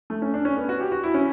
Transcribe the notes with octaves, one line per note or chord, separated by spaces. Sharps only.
A3
C#4
D4
C#4
B3
F#4
G4
F#4
E4
C#4